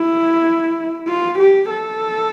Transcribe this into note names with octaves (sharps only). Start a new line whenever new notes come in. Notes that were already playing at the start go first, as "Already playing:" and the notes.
Already playing: E4
F4
G4
A4